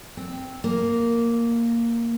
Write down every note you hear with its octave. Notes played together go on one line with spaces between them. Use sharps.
C4
A#3